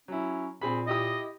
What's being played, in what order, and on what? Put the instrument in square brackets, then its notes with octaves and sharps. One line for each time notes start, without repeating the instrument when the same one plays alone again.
[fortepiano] F#3 E4 [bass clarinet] C#4
[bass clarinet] A#2 [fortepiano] C4 G#4 B5
[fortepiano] E4 G4 D#6 [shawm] D#5